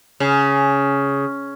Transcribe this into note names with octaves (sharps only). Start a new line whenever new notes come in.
C#3